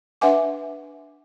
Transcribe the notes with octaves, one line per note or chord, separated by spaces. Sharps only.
D4 B4 E5 F#5 G#5 D6